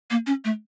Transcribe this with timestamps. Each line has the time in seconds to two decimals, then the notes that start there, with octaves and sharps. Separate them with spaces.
0.11 A#3
0.27 C#4
0.45 A3